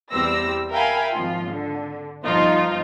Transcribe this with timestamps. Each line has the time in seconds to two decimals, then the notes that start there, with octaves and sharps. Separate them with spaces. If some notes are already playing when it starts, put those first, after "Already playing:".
0.11 E2 G3 C4 E6 A#6
0.71 A#4 E5 F5 G5 G#5 B5
1.13 G#1 F3 F4
1.50 D3
2.25 G1 F3 D#4 F4 C5